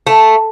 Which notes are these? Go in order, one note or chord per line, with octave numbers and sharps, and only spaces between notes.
A3